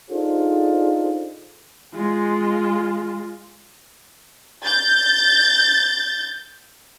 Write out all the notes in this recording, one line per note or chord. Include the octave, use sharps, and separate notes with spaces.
D4 D#4 F4 G#4 A4 C5
G#3 F4
G6 A6